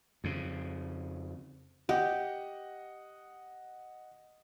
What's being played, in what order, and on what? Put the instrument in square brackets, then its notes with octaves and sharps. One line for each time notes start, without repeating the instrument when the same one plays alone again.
[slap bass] F2 C#3
[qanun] G4 [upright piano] D#5 F#5